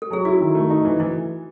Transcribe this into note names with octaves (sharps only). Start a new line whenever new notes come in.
A4
F#3 G#4
E4 F#4
D#3
A3
D#4
E3
E3 E4